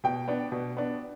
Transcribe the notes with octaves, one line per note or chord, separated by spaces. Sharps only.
B2 G5
B3 D4
B2
B3 D4